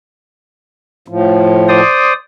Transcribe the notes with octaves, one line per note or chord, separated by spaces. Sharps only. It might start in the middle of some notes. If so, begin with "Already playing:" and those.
A2 F3
C5 D5 D#6